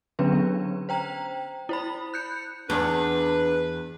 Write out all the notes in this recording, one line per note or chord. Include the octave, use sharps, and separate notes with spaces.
D3 F#3 B3 C#4 D4 B4
C5 G5 A#5
E4 C5 B5
F#6 G6 C#7
E2 D4 B4